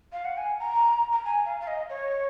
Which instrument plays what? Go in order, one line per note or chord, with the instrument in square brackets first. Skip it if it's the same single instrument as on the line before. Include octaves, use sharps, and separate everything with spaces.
[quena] F5
F#5
G#5
A#5
A#5
G#5
F5
F5
D#5
C#5